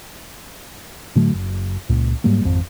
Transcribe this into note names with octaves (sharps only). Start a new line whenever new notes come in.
A2 D3 F#3 A3
F#1
C#2 A#2
G#2 F#3 G3 A#3
G#1 F2